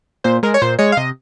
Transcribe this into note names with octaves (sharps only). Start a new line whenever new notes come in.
A#2 C5
G#3 A#4
C#5
A#2 C5
G#3 C#5
F5
C3 D#5